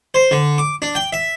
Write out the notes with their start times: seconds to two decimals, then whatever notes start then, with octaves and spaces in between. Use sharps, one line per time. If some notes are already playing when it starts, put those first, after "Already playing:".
0.14 C5
0.31 D3
0.58 D6
0.82 D4
0.95 G5
1.13 E5